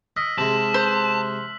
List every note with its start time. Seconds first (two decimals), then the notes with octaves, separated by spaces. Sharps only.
0.16 D#5 E6 F6 B6
0.38 C3 G#3 A5 F#7
0.74 C5 F#6